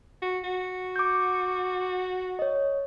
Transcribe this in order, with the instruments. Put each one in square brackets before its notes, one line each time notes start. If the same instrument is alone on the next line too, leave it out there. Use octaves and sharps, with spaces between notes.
[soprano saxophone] F#4
F#4
[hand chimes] D6 G6
C#5 D#5